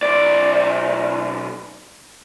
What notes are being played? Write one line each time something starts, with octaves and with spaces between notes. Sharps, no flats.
B1 D5